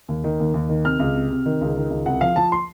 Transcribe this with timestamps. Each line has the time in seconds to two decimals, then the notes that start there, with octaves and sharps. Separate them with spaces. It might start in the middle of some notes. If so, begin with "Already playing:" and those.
0.08 D#2
0.24 D#3
0.40 D#2
0.54 D#2
0.69 D#3
0.85 C3 F6
0.99 C#2
1.15 C3
1.30 C3
1.46 D#3
1.61 C#2
1.76 D#3
1.90 C#2
2.06 C2 F#5
2.21 F3 F5
2.36 F3 A5
2.52 C6